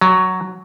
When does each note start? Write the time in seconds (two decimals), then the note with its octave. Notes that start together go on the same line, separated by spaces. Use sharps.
0.01 F#3